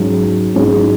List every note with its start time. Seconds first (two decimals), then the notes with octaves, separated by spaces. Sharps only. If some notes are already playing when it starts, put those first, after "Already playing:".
Already playing: G#2 F#3 C#4 G#4
0.54 G#2 F#3 C#4 G#4